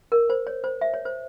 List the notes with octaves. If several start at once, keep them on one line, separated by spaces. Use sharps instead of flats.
A#4
C5
C#5
C5
E5
C#5
C5